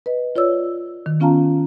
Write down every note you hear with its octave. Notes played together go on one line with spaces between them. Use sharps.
B4 D#5
F4 C#5 D5 E6
D#3
B3 C#4 F4 F5 A5 A#5